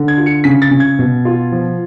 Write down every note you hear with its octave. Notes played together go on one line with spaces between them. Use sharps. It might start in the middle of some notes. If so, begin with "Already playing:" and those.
Already playing: D3
G#6
F4
C#7
C#3 B6
A6
C#3
G#6
B2
F4
F3